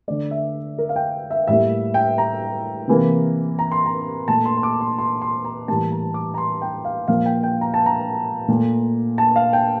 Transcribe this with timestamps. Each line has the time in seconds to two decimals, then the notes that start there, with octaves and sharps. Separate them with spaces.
0.08 D3 A3 D5
0.31 E5
0.78 A#4
0.89 F5
0.96 G5
1.31 E5
1.47 A2 G3 A#3 E5
1.94 G5
2.18 A#5
2.88 C3 E3 A#3
3.59 A#5
3.72 C6
3.86 A#5
4.28 A#2 A3 A5
4.45 C6
4.57 C6
4.63 D6
4.81 C6
4.99 C6
5.22 C6
5.45 A#5
5.68 A2 E3 G3 A#3 A5
5.92 A#5
6.14 D6
6.34 A#5
6.38 C6
6.62 G5
6.85 F5
7.08 A#2 F3 A#3 F5
7.26 G5
7.43 G5
7.61 A#5
7.74 A5
7.86 A#5
8.48 A#2 A3
9.18 A5
9.36 F5
9.53 G5